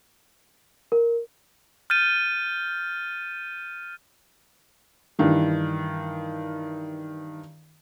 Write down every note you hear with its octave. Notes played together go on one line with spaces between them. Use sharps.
A#4
F6 G6 A6 D#7
G2 D#3 E3